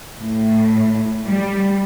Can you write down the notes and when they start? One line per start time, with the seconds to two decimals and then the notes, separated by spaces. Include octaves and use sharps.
0.19 A2
1.25 G3